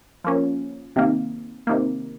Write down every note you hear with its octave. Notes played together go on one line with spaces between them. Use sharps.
F3 A#3 C#4
C3 D#3 A#3
C3 D#3 A#3